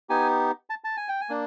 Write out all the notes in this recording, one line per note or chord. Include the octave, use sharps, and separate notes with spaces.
B3 D#4 G4 G#5
A5
A5
G#5
G5
G#5
A#3 D4